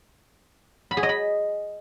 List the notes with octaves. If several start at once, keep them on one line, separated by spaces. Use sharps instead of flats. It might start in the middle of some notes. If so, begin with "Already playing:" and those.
B5
G#4
D#5
B5